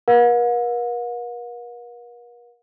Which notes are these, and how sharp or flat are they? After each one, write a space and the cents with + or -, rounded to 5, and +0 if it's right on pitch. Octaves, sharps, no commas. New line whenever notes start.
A#4 +45 F#5 -45